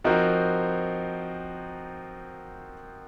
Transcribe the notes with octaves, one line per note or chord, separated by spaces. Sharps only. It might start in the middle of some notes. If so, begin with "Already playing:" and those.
F3 C4 D#4 F#4 A#4